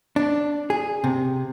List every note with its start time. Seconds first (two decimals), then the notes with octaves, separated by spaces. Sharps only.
0.16 D4
0.70 G#4
1.04 C3